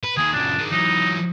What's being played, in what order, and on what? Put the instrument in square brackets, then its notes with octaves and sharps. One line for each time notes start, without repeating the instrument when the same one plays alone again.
[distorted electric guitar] B4
[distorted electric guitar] D#3 A#3 [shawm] G#4
[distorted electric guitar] C#2 F#2 [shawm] D4
[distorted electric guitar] D#3 G#3
[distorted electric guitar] E3 F#3 [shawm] D#4